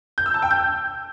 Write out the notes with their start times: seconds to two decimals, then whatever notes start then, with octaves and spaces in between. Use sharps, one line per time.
0.18 G6
0.26 E6
0.34 A5
0.42 G5
0.51 G6